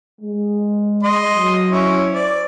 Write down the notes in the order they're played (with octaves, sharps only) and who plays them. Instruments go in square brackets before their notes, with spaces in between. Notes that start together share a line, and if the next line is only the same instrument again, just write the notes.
[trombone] G#3
[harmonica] D#5 C6
[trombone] F#3
[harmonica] C#4 E4
[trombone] C5 [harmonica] D5